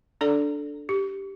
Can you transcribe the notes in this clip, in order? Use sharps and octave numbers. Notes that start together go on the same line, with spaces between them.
D4 A4 D5 A#5
G4